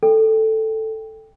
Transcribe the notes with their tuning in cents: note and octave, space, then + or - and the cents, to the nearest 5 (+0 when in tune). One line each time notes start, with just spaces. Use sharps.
A4 +0 G5 +10